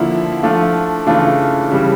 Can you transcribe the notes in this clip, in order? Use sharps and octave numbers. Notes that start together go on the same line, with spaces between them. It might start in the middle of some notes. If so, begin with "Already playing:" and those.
Already playing: D3 F3 A#3 E4
F3 A3 D4 F4
C#3 E3 A3 D4 F4
C#3 E3 G3